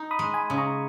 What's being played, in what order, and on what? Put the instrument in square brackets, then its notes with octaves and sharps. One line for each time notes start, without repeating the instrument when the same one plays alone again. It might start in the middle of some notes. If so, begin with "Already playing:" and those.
Already playing: [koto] D#4
[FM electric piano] B5 D#6
[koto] G#3
[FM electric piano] G#5 B5
[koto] C#3 [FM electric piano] D#6
[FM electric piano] A#5 C#6